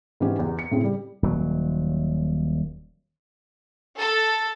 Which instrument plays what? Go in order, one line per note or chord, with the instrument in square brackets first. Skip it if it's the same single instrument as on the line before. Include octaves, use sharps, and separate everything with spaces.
[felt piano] G#2 E3 G#3 C#4 G4
E2
C#7
A2 C#3 C4 G#4
G3
[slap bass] D#1 F#3
[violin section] A4